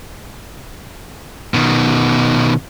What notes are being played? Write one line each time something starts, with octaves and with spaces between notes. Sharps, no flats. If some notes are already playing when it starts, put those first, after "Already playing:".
B2 D#3